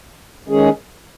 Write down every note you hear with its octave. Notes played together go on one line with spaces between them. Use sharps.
D#3 G#3 C#4 G#4